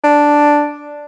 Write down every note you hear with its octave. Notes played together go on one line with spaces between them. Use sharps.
D4